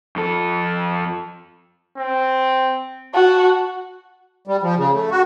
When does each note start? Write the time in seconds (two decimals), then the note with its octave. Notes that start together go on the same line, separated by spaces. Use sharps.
0.16 F2 A4
1.98 C4
3.14 F#4 A5
4.47 G3
4.63 F3
4.77 C#3
4.93 A3
5.11 F#4